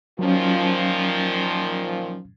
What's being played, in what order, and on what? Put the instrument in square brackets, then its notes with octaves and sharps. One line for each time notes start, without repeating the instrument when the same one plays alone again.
[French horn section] A#2 D#3 F3 [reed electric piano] F#3 C#4